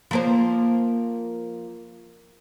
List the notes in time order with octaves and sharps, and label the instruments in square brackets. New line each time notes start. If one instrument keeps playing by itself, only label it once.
[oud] F3 A#3 C5